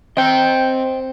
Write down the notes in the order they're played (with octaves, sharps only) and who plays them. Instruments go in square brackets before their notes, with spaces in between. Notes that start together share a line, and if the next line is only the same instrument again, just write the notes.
[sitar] C4 [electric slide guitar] D#5 G5